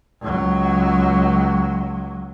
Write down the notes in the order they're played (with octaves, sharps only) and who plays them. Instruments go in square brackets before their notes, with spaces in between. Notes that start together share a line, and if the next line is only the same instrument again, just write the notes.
[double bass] C#2 F#3